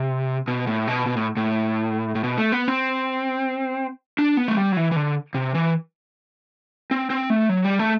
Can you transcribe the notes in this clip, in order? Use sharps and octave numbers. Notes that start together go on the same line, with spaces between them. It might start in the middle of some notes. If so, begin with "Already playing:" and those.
Already playing: C3
B2
A2
B2
B2
A2
A2
A2
B2
A3
B3
C4
D4
B3
A3
G3
F#3
E3
E3
D3
C3
E3
C4
C4
A3
F#3
G3
A3